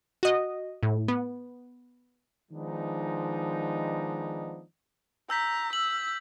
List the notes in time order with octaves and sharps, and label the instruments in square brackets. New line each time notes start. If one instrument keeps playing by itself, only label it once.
[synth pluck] F#4 D#5
A2
B3
[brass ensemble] D#3 F3 G#3 B3 D4 D#4
[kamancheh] A#5 [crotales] E6 G6 B6
[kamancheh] E6 [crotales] F#7